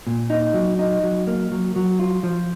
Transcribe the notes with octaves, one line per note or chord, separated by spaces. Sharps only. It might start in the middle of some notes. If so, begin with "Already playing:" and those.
A#2
D#4
F#3
D#4
F#3
A#3
F#3
F#3
F4
F3